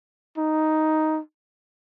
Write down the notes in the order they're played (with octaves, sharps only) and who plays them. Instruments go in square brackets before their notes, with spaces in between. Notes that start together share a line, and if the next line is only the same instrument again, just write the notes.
[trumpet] D#4